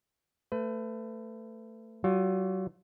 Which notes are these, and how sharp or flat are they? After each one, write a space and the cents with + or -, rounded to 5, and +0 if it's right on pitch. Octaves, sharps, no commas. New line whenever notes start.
A3 +20 B4 +30
F#3 +40 F4 +25